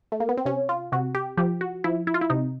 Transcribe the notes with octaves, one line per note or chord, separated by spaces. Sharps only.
A3
A#3
B3
C4
C3 C#4
F4
C3 F#4
G4
F3 G4
F#4
F3 E4
E4
F4
E4
C3 D#4